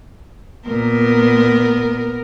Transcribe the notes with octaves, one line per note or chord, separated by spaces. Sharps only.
A#2 B3 A#4